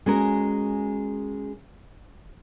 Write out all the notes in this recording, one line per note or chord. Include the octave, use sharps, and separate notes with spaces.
G#3 C#4 F#4 A#4